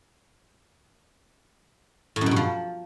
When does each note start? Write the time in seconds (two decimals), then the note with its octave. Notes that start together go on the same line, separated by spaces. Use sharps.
2.16 A2
2.21 F#2
2.26 B2
2.31 G2
2.36 F3